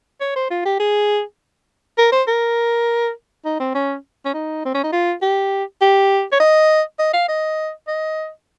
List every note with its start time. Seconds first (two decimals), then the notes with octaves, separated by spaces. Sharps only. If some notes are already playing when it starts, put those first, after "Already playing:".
0.21 C#5
0.36 C5
0.51 F4
0.65 G4
0.80 G#4
1.98 A#4
2.12 C5
2.28 A#4
3.45 D#4
3.60 C4
3.75 C#4
4.25 C#4
4.34 D#4
4.65 C4
4.75 C#4
4.84 D#4
4.93 F4
5.22 G4
5.82 G4
6.32 C#5
6.40 D#5
6.99 D#5
7.14 F5
7.29 D#5
7.88 D#5